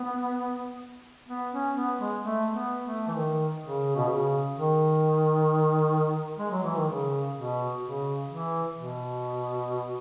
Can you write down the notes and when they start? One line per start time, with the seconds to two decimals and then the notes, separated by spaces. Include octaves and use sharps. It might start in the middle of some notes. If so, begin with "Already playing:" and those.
Already playing: B3
1.28 B3
1.52 C#4
1.75 B3
1.99 G#3
2.22 A3
2.52 B3
2.83 A3
3.07 E3
3.15 D#3
3.61 C#3
3.96 B2
4.08 C#3
4.55 D#3
6.38 G#3
6.51 F#3
6.63 E3
6.76 D#3
6.88 C#3
7.36 B2
7.82 C#3
8.29 E3
8.74 B2